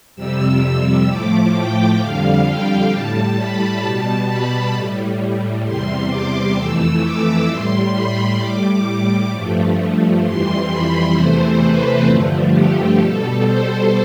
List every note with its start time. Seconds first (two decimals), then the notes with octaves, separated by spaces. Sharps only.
0.16 F2 C3 G3 E6
1.07 A2 F3 A3 D6
1.53 G5
1.99 F2 D3 G3 F5
2.45 G5
2.90 A2 G3 A5
3.36 B5
3.82 B2 G3 A5
4.27 B5
4.73 A2 G3
5.65 E2 C3 G3 C6
6.10 D6
6.56 F2 E3 A3 E6
7.03 D6
7.48 A2 G3 C6
7.94 B5
8.39 A2 G3 D6
8.85 D6
9.31 G2 F3 A3
10.22 F2 E3 G3 C6
10.68 B5
11.14 E2 C3 E3 A3 C5
11.60 B4
12.05 G2 D3 F3 A3
12.51 G4
12.97 B2 G3 A4
13.43 C5